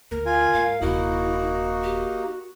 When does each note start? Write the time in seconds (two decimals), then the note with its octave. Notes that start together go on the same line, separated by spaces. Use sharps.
0.11 D2 A#4
0.26 F4 G#5
0.54 G#2 F5
0.81 D#1 C3 A#3 D#4 E4 F#4
1.83 G4